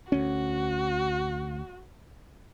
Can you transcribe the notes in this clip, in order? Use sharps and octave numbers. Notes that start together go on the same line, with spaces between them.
D2 C#4 F#4